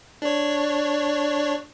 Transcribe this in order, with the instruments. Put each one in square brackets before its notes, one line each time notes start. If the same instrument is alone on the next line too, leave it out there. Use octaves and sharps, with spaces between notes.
[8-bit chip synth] D4 C#5